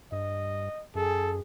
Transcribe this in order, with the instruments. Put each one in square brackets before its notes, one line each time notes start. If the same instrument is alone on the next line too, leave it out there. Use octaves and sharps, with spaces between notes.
[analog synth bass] G2 [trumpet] D#5
[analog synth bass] F#2 [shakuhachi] G#4 [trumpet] A4